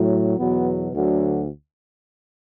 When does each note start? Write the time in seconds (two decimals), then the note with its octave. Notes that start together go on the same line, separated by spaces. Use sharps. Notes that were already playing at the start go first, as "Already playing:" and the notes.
Already playing: A2 F#3
0.38 E2 B2 F#3 B3
0.92 D2 D3 F#3